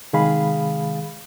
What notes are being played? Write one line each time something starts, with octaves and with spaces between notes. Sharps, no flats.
C3 D#3 G#3 G#4 F5 B5